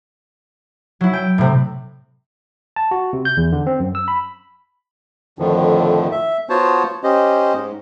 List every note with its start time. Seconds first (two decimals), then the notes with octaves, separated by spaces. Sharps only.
1.01 F#3 E4
1.13 G5
1.38 A2 C3
2.76 A5
2.91 F#4
3.13 C3
3.25 G6
3.37 E2
3.52 D3
3.67 C4
3.80 F#2
3.95 E6
4.08 B5
5.39 F2 A2 D3 D#3 F3
6.12 E5
6.49 B3 F4 F#4 C5 C#5 A5
7.04 C#4 G4 C5 D#5
7.54 G#2